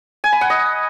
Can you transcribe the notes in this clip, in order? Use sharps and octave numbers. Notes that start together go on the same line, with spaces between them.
G#5
B5
F#5
D#5